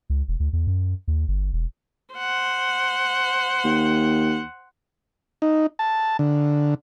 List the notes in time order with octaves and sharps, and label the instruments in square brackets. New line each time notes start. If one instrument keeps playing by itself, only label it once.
[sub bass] C#2
E1
D2
E2
F#2
D#2
G1
E1
[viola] C5 F#5
[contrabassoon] D#2
[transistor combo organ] D#4
A5
D3